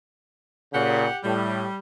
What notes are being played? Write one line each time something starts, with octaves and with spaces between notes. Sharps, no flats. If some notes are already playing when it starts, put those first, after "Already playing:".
A#2 C#3 G4 F#5
A2 G3